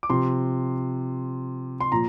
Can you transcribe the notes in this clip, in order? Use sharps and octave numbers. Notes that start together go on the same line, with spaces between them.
D6
C3 F3 C6
C6
A#2 F3 A#5